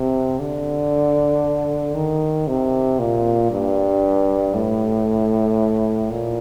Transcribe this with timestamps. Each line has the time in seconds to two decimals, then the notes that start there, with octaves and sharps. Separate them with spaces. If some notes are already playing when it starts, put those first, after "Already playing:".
Already playing: C3
0.40 D3
1.95 D#3
2.48 C3
2.99 A#2
3.51 G2
4.54 A2
6.10 A#2